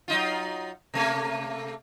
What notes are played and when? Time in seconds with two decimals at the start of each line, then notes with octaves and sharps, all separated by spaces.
0.08 F#3 D#4 F4
0.94 C3 A3 A#3